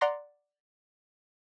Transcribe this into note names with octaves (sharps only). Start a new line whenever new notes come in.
D5 F#5 A#5 C6 A#6